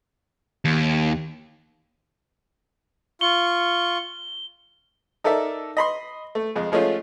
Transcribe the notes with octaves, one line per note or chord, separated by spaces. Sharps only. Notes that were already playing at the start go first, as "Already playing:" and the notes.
D#2
F4 C#6 G7
D#4 A4 A#4 D5 E5
D#5 B5 C6
A3
F2 G#3
F3 G#3 A3 C#4 F4